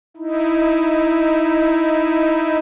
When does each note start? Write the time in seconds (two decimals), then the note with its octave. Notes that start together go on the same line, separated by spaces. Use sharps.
0.17 D#4 E4